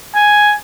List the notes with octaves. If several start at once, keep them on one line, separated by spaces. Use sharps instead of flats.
G#5